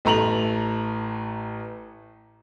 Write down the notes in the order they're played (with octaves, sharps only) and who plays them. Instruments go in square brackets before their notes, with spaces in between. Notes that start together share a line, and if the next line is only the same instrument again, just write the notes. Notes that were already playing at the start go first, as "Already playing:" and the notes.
[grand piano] A1 A3 A#5 F7 F#7